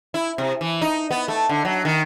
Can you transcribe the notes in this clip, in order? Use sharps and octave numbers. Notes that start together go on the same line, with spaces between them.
E4
C3
E3
D#4
B3
A3
D3
F#3
D#3